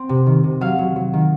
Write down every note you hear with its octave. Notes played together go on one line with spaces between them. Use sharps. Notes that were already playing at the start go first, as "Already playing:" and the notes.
Already playing: C4
C3
D#3
C3
F#3 F5
F#3
F#3
D#3